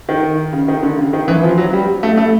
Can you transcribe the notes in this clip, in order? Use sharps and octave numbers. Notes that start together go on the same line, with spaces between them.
D#3
C#3
D#3
D3
C#3
D#3
E3
F3
F#3
G3
A3
A3